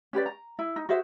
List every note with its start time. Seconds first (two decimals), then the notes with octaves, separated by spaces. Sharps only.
0.13 C#4 G4 B4 D5
0.26 A#5
0.59 E4
0.76 D#4
0.89 F#4 G#4 C5 E5